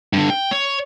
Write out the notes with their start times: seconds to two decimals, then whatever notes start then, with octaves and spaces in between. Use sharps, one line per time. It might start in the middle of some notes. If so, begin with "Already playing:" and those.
0.13 G2 D3
0.30 G5
0.51 C#5